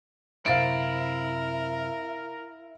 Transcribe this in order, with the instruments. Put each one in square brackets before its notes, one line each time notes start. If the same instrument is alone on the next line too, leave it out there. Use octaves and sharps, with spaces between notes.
[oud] F#2 C3 C5 [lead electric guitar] E4 [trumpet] A#4 [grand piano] F5 A6 D7